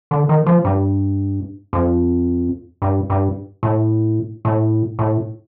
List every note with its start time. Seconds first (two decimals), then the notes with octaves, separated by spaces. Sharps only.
0.11 D3
0.29 D#3
0.47 F3
0.65 G2
1.73 F2
2.82 G2
3.10 G2
3.63 A2
4.45 A2
4.99 A2